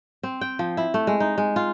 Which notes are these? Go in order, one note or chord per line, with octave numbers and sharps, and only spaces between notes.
C4
G5
F3
E4
A3
G#3
D#4
G#3
F4